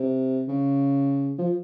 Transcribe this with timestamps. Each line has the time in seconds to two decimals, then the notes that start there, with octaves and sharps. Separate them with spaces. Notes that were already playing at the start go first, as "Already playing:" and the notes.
Already playing: C3
0.48 C#3
1.38 F3